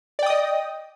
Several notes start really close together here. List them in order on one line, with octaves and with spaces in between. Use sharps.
D5 G5 D#6 D#5